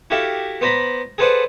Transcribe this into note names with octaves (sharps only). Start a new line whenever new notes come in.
E4 F#4 G4 A4 E5 F5
B3 C5 D5 A#5 B5
G#4 A4 B4 C5 D5 F#5